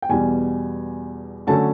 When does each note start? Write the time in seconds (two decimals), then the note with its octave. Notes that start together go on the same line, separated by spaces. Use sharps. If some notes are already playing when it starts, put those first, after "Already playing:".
0.02 G5
0.09 E2 B2 G3 G#5
1.47 D3 F#3 A3 C#4 A5